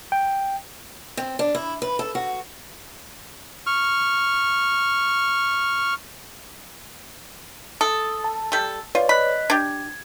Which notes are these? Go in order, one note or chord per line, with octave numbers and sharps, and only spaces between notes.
G5
C4
D4
E4
B4
A4
F#4
C#6 F6
A4 D#6
A5
G3 A4
F4 B4 C#5 D5
D#5 B5 F#6 B6
D4 G4 G#6